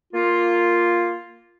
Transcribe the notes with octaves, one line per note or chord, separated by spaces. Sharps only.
A#3 F4